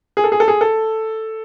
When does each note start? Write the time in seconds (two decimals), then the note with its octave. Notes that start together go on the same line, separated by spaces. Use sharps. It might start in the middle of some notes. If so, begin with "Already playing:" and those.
0.17 G#4
0.24 A4
0.32 G#4
0.40 A4
0.48 G#4
0.61 A4